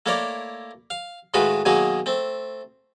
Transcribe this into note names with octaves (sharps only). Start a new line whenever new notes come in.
A3 A#3 E4 A#4 C#5 D5
F5
A2 D#3 G#3 F4 F#4 B4
B2 D#3 F#3 A#3 D#4 G#4
A3 C4